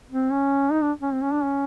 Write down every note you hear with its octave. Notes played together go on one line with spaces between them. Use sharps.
C4
C#4
D#4
D4
C#4
C4
C#4
D4
C#4